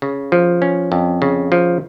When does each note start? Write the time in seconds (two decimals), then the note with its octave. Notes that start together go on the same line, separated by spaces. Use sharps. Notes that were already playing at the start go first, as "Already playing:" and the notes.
0.02 C#3
0.32 F3
0.62 C#4
0.92 F2
1.22 C#3
1.52 F3